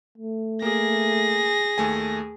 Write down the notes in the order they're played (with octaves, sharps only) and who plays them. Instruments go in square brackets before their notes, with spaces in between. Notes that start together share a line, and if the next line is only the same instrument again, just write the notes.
[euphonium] A3
[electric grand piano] A#3 [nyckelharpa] G#4 [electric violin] A#6
[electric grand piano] D#2 A3 G#5